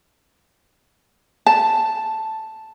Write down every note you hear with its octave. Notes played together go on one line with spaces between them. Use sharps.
A5